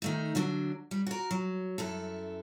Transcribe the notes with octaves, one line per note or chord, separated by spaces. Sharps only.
D#3 A3 D#4
D3 F#3 D4
G3
F#4 A#4
F#3
F#2 E4 A4